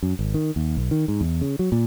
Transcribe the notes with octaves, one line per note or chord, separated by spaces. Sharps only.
F#2
G#1
D#3
D#2
B1
D#3
G#2
E2
C#3
F#3
A#2